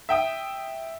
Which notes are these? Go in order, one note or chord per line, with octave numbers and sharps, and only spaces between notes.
E5 G5 D#6